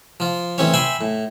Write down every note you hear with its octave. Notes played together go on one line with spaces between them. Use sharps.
F3 F4
A1 E3 C4 C#4 C#5
E5 G5 G#5 B5 C6
A2